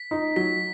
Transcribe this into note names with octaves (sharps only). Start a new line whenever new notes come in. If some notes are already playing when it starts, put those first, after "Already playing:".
Already playing: B6
D#4
F#3 B6